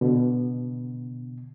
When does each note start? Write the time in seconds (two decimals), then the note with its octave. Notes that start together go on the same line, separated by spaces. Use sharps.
0.01 B2 D3